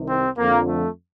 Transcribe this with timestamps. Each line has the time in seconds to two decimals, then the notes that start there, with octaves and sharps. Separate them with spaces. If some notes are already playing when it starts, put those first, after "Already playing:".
Already playing: C2 C3 D#3
0.08 C4
0.38 F2 D3 F3 A#3
0.68 A3